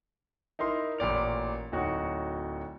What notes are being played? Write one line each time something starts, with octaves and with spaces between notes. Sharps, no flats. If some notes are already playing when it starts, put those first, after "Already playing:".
D#4 E4 A#4 C6
A1 A#2 D5 F7
D1 D#4 F#4 C#5